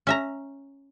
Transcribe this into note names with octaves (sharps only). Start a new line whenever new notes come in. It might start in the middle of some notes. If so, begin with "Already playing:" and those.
C#4 E5 A#5